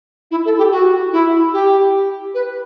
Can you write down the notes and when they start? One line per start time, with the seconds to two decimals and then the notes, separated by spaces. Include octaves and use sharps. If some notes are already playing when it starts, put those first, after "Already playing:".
0.31 E4
0.45 A4
0.57 G4
0.71 F#4
1.12 E4
1.52 G4
2.34 B4